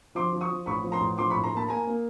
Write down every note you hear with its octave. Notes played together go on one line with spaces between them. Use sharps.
F3 C6 D6
F3
C#6 D#6
F3
A1 B5 C#6
F3
A#5 C6
A1
F3 C6 D6
B5 C#6
A2
A#5 C6
A#3 A5 B5
A#3 G#5 A#5
A#3